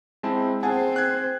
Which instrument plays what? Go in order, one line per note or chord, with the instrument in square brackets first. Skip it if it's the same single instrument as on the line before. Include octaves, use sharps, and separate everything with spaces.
[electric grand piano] G#3 C4 E4 [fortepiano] A5
[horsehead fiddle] C4 C5 [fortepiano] G#4 F#5 G#5 [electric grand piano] A5
[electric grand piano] F#6 G#6